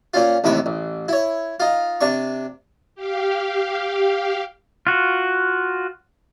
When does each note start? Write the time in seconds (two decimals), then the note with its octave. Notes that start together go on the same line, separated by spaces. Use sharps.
0.14 A#2 C#4 F4
0.44 A1 D#2 A2 C3 B5 C#6
0.66 A1
1.08 E4 C#5
1.60 D#4 F4
2.01 C3 D4 C#6
2.95 G4 F5
4.87 F4 F#4